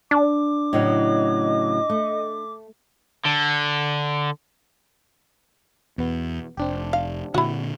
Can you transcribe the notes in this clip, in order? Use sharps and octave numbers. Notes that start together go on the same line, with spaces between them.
D4 D6
A2 C#3 F#3 D#5
A3
D3
E2 B2 B3
F1 C4 D4 G4
F5
A#2 D3 E4 F#4